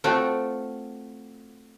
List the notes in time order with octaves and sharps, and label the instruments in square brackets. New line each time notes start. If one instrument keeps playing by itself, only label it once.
[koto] A3 C4 F4 F#4 A4